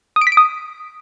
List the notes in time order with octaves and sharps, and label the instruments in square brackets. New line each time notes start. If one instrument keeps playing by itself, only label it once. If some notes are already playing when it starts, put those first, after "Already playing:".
[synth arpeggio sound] D#6
D7
B6
D7
D#6